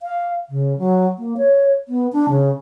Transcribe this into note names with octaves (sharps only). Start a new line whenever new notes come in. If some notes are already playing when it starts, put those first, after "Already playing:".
F5
C#3
F#3
A#3
C#5
B3
D4
C#3